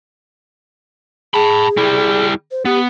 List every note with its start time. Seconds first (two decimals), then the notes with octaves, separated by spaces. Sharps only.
1.34 G#4 A5 B5
1.77 G3 E4
2.51 C5
2.65 B3 G4